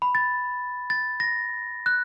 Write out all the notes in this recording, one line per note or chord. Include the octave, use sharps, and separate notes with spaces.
B5
A6
A6
A#6
F#6